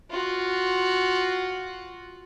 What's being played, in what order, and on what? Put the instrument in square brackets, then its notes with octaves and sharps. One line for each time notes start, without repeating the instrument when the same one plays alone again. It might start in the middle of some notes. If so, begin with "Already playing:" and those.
[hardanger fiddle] F4 F#4